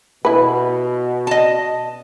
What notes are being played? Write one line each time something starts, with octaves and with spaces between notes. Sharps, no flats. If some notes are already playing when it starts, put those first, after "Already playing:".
B2 E4 B4
D#5 A5